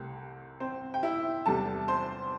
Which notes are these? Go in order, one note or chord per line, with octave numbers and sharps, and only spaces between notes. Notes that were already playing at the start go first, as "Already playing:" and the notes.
Already playing: C2 C3 A3 C4
C4 C5
G5
E4 E5
E2 C3 G3 D4 A4 A5
C5 C6